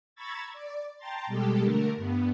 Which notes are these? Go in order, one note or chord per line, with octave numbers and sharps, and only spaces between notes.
A#5 B5 C#6 E6 G#6 A6
D5
G5 A5 A#5 C6 A6
B2 G3 G#3 G4 A4
D3 A3 A#4
G2 B3